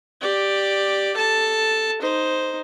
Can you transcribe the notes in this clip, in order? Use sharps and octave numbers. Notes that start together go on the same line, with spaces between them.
G4 D5
A4 A5
D#4 C5